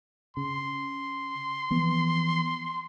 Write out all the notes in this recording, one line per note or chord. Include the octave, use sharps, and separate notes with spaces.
C#3 C6
E3 F3 B3